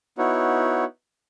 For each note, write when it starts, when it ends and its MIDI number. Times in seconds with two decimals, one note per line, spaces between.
0.18 0.84 59
0.18 0.84 63
0.18 0.84 64
0.18 0.84 66
0.18 0.84 73